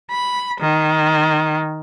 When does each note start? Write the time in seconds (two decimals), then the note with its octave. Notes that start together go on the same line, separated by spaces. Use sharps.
0.11 B5
0.61 D#3